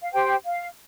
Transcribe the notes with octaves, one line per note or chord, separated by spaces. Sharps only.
F5
G4 C5 G5
F5